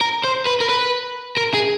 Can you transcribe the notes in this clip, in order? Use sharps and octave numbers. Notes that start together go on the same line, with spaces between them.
A#4
C5
B4
A#4
B4
A#4
G#4